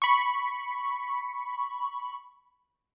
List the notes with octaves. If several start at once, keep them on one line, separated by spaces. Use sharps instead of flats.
B5 C#6